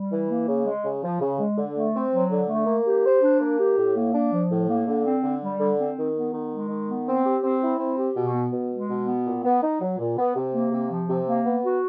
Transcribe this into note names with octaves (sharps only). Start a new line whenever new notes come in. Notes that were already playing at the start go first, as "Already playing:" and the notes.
Already playing: G3
E3
A#3
C#3
G#3
C#3
F3
C#3
G#3
D3
A3
C4
F#3
D3
A3
A#3
G4
C5
D4
A#3
G4
A2
A#3
D4
F3
A2
A#3
D3
C4
D3
G3
D3
C4
D#3
B3
D#3
G#3
D#3
B3
C4
G4
C4
E4
C4
G4
B2
B3
B2
G#3
B2
B3
A#2
B3
D#4
F#3
A#2
B3
C3
A#3
C3
F3
C3
A#3
B3
F#4